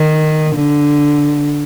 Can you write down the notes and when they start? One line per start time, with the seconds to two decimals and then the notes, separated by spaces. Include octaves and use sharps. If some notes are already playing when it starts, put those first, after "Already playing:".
Already playing: D#3
0.55 D3